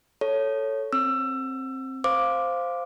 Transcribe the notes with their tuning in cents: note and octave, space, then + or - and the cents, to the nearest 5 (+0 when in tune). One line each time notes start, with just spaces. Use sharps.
A4 +0 C#5 +0
C4 +15 E6 +25
C5 -5 F5 +0 D6 +0